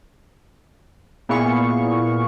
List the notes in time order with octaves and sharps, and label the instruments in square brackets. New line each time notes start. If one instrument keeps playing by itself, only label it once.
[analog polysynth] A#2 B3 E4 G#4 F5 C#6